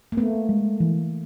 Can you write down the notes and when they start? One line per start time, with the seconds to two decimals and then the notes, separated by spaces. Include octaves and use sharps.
0.12 A#3
0.17 A3 B3
0.49 G#3
0.80 E3